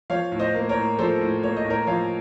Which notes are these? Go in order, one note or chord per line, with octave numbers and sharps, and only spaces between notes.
F3 C#5 F5
A2
C5 D#5
A#3
A#4 C#5
A2
F3 A4 C5
A2
A#3 C#5
D#5
A2
A#4 C#5
F3 C#5 F5